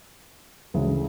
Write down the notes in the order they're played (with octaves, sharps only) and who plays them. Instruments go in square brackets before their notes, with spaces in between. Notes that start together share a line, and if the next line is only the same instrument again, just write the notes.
[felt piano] D2 C#3 E3 G#3